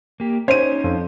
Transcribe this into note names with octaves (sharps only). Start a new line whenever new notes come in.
A#3 G4
C#4 D#4 C5 C#5 D#7
F2